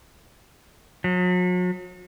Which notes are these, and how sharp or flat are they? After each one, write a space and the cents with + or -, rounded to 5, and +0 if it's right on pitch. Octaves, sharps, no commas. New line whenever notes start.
F#3 -40